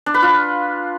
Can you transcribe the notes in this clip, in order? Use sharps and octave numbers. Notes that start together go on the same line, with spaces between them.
D4
B4
F4